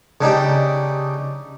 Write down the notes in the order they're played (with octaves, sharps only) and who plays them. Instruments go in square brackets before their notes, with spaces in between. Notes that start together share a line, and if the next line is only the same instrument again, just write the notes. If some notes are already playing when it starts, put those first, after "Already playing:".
[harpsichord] C#3 D4 D#4 G4